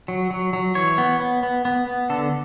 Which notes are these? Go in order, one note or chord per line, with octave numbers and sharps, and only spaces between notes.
F#3
F#3
F#3
E3 C#5
B3
B3
B3
B3
B3
D3 A4